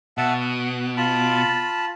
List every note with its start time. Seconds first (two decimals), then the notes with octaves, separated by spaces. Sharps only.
0.18 B2 E5 F#5 A5
0.41 F#6
0.97 F4 A5 B5